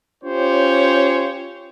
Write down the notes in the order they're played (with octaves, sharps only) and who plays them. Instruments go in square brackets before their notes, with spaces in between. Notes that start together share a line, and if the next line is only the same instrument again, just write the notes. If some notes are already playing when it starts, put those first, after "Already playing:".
[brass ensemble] C#4 F4 G4 C5 C#5